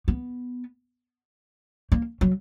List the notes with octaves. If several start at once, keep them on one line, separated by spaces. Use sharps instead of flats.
B3
A#3
F#3